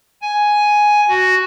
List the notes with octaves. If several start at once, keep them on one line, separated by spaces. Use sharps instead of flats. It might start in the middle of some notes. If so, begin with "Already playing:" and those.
G#5
F#4